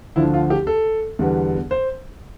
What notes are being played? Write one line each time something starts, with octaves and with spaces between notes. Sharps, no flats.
D2 D3 F3 E4
F4
G4
A4
E2 D3 G3 B3
C5